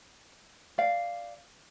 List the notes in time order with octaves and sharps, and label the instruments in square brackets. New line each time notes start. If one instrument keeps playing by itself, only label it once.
[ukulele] D5 F5